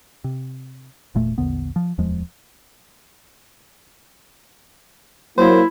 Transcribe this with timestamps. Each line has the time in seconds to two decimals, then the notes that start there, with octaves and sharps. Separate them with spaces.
0.24 C3
1.15 E1 A#2 A3
1.38 A#1 E2 D3 B3
1.76 F3
1.98 D1 E2 F3 G#3
5.38 F#3 A#3 E4 C5